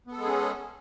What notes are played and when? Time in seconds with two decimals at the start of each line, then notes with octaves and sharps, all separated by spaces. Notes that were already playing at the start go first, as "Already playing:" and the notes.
0.07 B3
0.12 A4
0.17 G#3
0.22 G#4
0.27 C#4